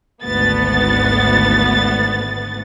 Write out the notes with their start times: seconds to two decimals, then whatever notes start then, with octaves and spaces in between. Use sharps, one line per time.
0.24 G#1 D2 B3 A6